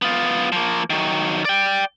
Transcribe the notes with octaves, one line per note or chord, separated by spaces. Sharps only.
B3 F4
F3 A#3
D#3 F#3
D5 G5